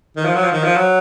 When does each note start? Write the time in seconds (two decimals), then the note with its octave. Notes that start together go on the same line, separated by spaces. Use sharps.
0.17 D#3
0.25 F3
0.35 F#3
0.43 F3
0.52 D#3
0.64 F3
0.76 F#3